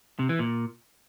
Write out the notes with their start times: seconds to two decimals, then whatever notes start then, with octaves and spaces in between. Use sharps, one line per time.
0.19 C3
0.29 E3
0.39 A#2